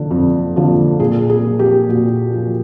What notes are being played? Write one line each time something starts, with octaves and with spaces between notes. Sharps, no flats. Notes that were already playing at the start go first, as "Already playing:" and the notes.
Already playing: D3 F3
F2
D3 F3
A#2 G#4
G#4
F3
G4
A#2 F#4
F3